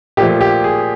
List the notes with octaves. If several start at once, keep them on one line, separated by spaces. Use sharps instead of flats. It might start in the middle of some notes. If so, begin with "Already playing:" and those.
A#2 F3 A3 G4
G4
G#4